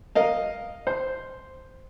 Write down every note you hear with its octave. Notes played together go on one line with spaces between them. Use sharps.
A#4 D#5 F5
C5